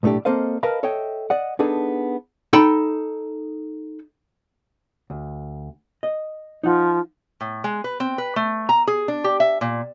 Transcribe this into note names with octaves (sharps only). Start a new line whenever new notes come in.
B1 A2 A3 D4 G4
A#3 C4 A4 C5 D#5 F5
A#4 B4 D#5 F5 A5 B5
A4 C#5 D#5 E5 G5
D5 D#5 F#5
B3 D4 D#4 G#4 A4
D#4 A4 G5 B5
D2
D#5
F3 D#4 F#5
A2
G#3
B4
C4
B4
A3
A#5
G#4
D4
G4
E5
A#2